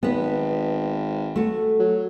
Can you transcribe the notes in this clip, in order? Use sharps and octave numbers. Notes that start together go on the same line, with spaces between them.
G#1 B3 B4
A3 F#4
F#3